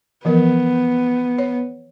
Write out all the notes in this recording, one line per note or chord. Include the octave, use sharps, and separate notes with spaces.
E3 F3 B3 A#4
C#5